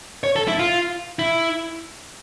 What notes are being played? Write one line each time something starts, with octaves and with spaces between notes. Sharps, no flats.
C#5
A4
E4
F4
E4